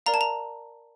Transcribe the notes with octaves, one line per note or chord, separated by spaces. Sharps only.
A#4 D5 F5 A#5
A5
A#5